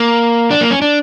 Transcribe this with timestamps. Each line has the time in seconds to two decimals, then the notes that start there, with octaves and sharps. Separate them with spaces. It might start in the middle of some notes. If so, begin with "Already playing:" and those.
Already playing: A#3
0.51 D4
0.61 A#3
0.71 C#4
0.82 D4